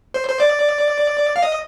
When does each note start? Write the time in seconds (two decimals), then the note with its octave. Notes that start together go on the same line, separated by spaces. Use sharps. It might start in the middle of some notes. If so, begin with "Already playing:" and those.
0.14 C5
0.29 C5
0.40 D5
1.36 F5
1.43 D#5